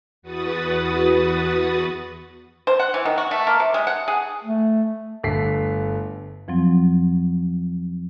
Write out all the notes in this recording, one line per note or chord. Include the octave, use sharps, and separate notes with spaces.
E2 F#4 B4 D#6 A6
C5
F#5
E3
D#3
F#4
A3
A#3
C3
G#3
F#5
G#4
A3
G1 A3 A4 B6 C7
F2 F3 F#3 C4